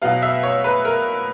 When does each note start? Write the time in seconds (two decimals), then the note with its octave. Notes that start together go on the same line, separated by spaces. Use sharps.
0.02 B2 F#3 B3 F5
0.22 E5
0.43 C#5
0.64 B4
0.85 A#4